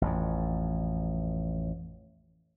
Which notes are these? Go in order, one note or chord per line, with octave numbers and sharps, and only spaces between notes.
A1 F2